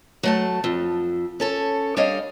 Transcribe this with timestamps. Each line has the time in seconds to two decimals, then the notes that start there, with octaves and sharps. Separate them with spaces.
0.23 F#3 A3 A5
0.64 F2
1.40 C#4 A4 C#5
1.97 G3 D4 C#5 D#5 F5